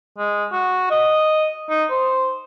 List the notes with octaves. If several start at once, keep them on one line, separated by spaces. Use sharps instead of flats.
G#3
F#4
D#5
D#4
C5